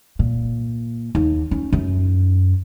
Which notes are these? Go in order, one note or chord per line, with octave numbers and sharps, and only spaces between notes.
A#2
D#2
C#4
F#2